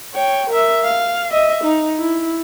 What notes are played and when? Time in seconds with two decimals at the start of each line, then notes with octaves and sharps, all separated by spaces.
0.14 C#5 G5
0.50 A#4 E5
0.84 F5
1.32 D#5 E5
1.64 D#4
1.99 E4